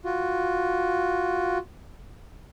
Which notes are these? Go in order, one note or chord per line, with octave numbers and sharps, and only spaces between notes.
F4 F#4